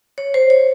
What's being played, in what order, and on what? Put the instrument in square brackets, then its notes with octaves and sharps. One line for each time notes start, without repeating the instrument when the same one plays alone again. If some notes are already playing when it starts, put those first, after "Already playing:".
[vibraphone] C#5
C5
C#5